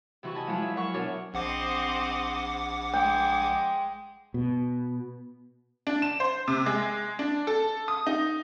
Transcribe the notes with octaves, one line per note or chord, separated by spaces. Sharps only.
C3 E3 F#4 C#6
D#5 G#5 A5 B5
F3 F#3 G#3 E4 B4 C#5
E5
A#4 C#5 E5 F#5 C#6
B2 D4 A#4 C#5
A#1 C4 C5 D#5 F#5 D6
G#3 G5
B2
D4
E7
C5
C3
G#3
D4
A4
D#6
D#4